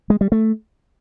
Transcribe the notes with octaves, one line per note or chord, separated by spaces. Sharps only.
G#3
G3
A3